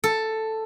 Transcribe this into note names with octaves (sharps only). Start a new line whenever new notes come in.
A4